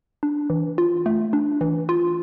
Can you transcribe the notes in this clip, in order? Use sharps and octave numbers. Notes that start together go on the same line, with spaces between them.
D4
E3
F4
A3
D4
E3
F4